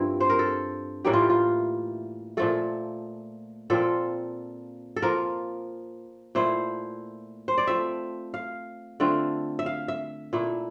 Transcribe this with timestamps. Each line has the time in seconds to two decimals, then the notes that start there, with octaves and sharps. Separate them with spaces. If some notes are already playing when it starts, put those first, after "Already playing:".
Already playing: G2 F3 C4 E4 A#4
0.20 C5
0.30 A#4
0.39 A4
1.05 A2 E3 G3 A#3 G4
1.14 F4
1.30 F4
2.37 A#2 F3 A3 A4
3.70 A#2 F3 C4 F4 A4
4.96 A4
5.02 F3 A#3 F4 A#4
6.35 A#2 A3 E4 C5
7.48 C5
7.58 D5
7.67 F3 A3 C4 E5
8.34 F5
9.00 D3 A3 C4 F4
9.59 E5
9.66 F5
9.88 E5
10.33 A#2 A3 E4